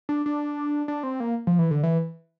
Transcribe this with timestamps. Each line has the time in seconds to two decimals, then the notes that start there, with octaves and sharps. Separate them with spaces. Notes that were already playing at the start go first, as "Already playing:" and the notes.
0.09 D4
0.26 D4
0.88 D4
1.03 C4
1.20 A#3
1.47 F3
1.59 E3
1.71 D3
1.83 E3